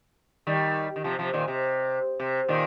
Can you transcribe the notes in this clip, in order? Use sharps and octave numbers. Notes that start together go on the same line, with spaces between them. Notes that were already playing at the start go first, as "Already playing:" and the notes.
D#3 G3
D#3
C3 F3
C3 F3
A#2 D#3
C3
C3
A#2 D#3